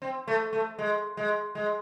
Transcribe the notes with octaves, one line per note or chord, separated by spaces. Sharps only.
C4
A3
A3
G#3
G#3
G#3